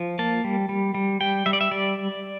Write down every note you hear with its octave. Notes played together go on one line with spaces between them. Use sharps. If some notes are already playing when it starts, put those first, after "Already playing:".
Already playing: F3
A#3 A5
G3
G3
G3
G3 G5
G3 E5
D5
E5
G3 D5